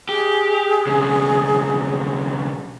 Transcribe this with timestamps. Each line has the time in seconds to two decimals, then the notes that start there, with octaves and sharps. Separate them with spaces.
0.09 G4 G#4
0.87 B1 C#3